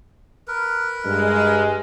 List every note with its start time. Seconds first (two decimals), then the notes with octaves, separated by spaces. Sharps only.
0.48 A#4 B4
1.05 G2 G#3